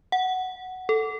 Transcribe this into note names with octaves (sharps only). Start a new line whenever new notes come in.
F#5
A4